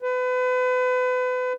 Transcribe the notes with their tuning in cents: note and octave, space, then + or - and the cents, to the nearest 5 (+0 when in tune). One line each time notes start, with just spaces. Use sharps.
B4 +35